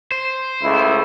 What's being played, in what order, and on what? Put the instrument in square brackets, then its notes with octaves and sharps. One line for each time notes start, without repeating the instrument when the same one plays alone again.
[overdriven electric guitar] C5
[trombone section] C#2 A3 E4